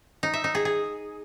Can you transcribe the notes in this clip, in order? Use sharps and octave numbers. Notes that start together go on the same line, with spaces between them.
D#4
E5
D#4
G#4
G#4